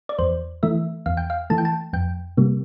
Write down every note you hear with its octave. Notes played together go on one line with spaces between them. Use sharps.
D5
E2 C5
E3 A3 E5
E2 F5
G5
F5
E3 A3 A5
G5
A5
F2 G5
C3 G3 A#3